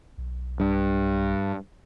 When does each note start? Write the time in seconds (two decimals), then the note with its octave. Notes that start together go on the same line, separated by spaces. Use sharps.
0.18 B1
0.60 G2